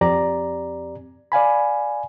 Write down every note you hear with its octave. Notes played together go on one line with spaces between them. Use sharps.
F2 C4 G4 D5 A#5
D5 F5 G#5 B5